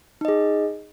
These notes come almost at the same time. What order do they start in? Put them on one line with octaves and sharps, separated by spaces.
D#4 D#5 G#4